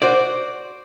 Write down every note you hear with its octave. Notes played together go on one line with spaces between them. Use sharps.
F#4 C5 D5